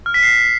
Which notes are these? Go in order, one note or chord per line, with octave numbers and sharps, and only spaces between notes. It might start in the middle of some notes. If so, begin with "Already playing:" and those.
F6
B6
C7